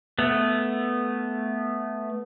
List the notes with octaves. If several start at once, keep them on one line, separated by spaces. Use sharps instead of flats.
A3 B3